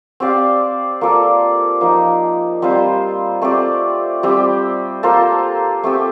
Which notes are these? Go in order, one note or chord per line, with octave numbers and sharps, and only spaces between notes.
C4 G4 D5 F5
A#3 F4 A4 D5
F3 A#3 D#4
G3 C4 F4 C5
A3 C4 G4 D5
G3 C4 G4
A#3 F4 A4 C5
A3 C4 G4